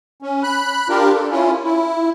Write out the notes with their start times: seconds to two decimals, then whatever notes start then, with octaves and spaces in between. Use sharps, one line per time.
0.22 C#4
0.43 B5 F#6
0.89 D4 F4 G4 A#4
1.14 A4
1.31 C#4 E4 F4
1.64 E4